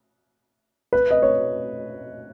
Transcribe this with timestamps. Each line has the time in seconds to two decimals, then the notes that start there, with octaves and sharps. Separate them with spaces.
0.93 B4
1.11 D#5
1.22 C#5